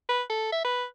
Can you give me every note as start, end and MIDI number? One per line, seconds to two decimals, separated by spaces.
0.09 0.23 71
0.30 0.50 69
0.52 0.60 76
0.64 0.85 71